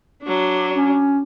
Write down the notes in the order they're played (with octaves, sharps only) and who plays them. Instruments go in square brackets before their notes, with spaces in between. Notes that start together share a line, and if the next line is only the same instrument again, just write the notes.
[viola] F#3 D4
[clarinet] C#4